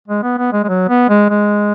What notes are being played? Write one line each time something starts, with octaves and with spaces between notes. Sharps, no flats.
G#3
B3
B3
G#3
G#3
F#3
B3
G#3
G#3